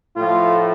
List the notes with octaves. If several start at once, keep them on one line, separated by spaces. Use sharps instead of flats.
A2 F3 A3 F4